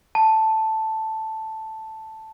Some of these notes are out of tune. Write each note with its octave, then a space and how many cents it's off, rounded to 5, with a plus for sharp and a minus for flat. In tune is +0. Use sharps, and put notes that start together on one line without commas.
A5 +0